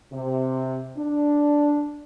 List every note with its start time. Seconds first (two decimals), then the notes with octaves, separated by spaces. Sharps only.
0.12 C3
0.97 D4